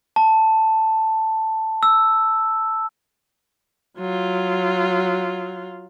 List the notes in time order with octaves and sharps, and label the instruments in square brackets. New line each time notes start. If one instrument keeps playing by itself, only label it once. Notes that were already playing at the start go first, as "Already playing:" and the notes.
[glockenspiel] A5
E6
[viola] F#3 F4